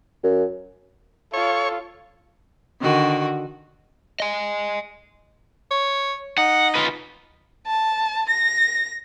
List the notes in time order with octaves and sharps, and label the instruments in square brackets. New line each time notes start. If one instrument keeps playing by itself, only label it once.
[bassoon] F#2
[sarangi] F4 [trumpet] A4 [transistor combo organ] C#5
[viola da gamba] D3 D#3 F#4
[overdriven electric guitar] D#5 G#5
[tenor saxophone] C#5
[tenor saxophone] D#4 [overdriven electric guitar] F#5
[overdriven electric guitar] F4 B4
[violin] A5
A#6